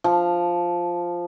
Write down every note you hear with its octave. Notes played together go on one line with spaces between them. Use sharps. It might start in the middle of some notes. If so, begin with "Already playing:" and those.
F3